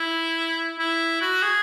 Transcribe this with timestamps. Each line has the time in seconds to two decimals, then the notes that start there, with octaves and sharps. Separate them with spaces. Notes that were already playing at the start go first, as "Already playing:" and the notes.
Already playing: E4
0.79 E4
1.21 F#4
1.42 G#4